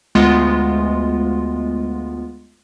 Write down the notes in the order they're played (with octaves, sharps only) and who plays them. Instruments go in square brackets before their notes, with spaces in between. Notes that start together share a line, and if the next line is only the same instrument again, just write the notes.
[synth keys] D2 G#3 B3 F4